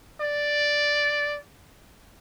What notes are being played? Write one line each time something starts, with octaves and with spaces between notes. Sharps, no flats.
D5